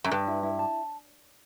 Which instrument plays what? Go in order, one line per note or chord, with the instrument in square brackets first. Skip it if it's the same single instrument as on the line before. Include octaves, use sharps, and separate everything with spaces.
[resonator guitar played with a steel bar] F#2
[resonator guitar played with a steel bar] G2 [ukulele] B4
[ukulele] E4
E4
A5